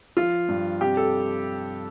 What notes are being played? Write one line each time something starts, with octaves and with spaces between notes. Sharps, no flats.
F3 F4
G2
C3 G4
A4